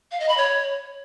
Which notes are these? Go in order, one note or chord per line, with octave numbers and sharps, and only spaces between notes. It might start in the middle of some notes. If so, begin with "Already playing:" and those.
F5
D#5
B5
C#5